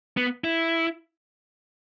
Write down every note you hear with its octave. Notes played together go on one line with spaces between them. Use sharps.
B3
E4